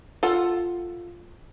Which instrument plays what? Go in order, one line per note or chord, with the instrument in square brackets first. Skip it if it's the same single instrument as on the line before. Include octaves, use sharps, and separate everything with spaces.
[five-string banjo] F4 A4 F#5